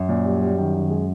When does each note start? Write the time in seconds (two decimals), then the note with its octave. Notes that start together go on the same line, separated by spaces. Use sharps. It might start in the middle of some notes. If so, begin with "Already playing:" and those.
Already playing: F#2
0.09 A#2
0.25 G3
0.42 G3
0.58 D#3
0.74 D#3
0.90 G#3